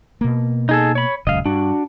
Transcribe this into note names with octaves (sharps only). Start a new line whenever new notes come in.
B2 A#3
D#4 G#4 A4
C#5 B5
D#1 C#2 F#2 D#5 F5
G2 D4 F#4